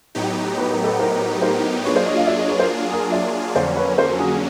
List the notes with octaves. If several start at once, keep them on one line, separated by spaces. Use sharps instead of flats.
A2 F#3 B3 D#4 G4
B4
A#4
A4 B4
A#4 C5
A#4 C5
F#3 A#3 D4 F4 G#4 B4 C#5
C5 D5
C#5 D#5
D#5 F5
D5 E5
C#5 D#5
B4 C#5
A#4 C5
G#4 A#4
D5 E5
F2 D3 F#3 A#3 C#4 C5 D5
B4 C#5
A#4 C5
F#4 G#4